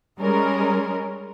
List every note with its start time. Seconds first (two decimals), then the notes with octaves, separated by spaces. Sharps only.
0.20 G3 G#3 C#4 A#4